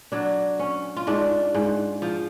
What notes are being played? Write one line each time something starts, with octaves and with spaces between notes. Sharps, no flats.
F#3 D4
C#4
F4
G#2 D4
G#2
F3